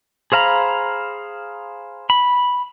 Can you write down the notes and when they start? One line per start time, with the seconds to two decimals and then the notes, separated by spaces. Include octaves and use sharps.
0.32 G#4 C5 F5 A#5 B5
2.10 B5